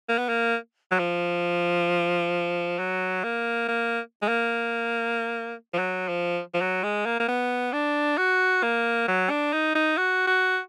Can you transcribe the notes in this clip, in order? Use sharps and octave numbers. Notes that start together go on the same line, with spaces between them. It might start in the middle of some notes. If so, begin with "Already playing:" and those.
A#3
B3
A#3
F#3
F3
F#3
A#3
A#3
G#3
A#3
F3
F#3
F3
F3
F#3
G#3
A#3
A#3
B3
D4
F#4
A#3
F#3
D4
D#4
D#4
F#4
F#4